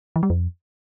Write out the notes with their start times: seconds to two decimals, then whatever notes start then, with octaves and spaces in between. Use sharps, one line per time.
0.16 E3
0.23 G3
0.30 F2